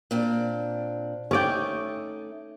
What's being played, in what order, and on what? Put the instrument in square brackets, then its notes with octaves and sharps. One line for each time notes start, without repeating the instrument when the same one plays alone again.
[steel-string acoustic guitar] A#2 C4 D4
[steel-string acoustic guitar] A3 D#4 [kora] C#4 D5 G5